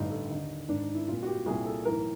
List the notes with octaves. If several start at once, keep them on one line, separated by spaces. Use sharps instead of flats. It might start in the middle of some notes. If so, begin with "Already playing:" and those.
Already playing: A1 G2 D3 D#4
A4
D#2 D3 D#4
G#1 G#2 D#3 D4
E4
C2 A#2 F4
F#4
G4
C2 A#2 G#4
A4
B1 A2 E3 A#4